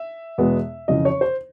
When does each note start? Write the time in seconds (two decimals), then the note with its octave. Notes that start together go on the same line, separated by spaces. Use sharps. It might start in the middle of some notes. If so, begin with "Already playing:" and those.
Already playing: E5
0.38 E2 B2 G#3 B3
0.88 F2 C#3 E3 D#5
1.05 C#5
1.21 C5